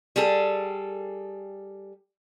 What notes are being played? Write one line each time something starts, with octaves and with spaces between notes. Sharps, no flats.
G3 G#4 A4